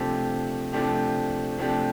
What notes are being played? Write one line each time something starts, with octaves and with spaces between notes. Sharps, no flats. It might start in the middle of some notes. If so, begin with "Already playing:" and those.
Already playing: C3 F3 A3 D4 G4
C3 F3 A3 D4 G4
C3 F3 A3 D4 G4